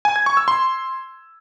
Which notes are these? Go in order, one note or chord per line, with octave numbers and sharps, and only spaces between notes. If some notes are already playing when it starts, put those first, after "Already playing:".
G#5
G#6
C#6
E6
C6